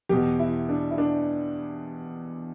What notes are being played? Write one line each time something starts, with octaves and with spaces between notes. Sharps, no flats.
E2 B2 G4
E4
D4
E4
D4